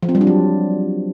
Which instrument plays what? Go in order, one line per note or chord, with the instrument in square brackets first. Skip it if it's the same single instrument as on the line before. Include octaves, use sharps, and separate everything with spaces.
[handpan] F3
C4
G3
D4
F#3